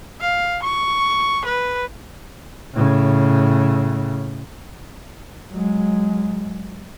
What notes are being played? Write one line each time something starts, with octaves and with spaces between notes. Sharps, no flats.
F5
C#6
B4
A2 C#3
F#3 G#3